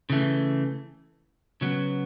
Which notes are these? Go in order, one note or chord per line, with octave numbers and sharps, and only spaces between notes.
C#3 E3 A3
C#3 F#3 B3